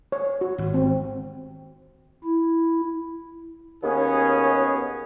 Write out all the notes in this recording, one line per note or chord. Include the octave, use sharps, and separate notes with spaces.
C#5
F#4
G#1
C4
E4
D#2 B3 C#4 G#4